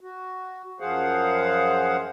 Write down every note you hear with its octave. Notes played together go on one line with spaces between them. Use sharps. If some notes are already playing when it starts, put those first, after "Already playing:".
F#4
F#2 F3 G#4 C5 F5 F#5